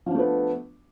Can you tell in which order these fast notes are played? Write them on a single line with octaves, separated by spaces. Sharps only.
F3 D4 A3 B3